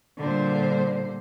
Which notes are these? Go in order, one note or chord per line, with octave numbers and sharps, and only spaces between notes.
A#2 D3 G3 C5